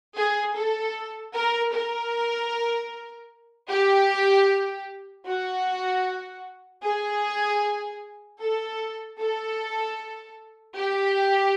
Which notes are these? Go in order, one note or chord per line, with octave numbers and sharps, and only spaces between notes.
G#4
A4
A#4
A#4
G4
F#4
G#4
A4
A4
G4